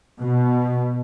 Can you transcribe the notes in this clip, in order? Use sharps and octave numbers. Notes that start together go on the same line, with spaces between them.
B2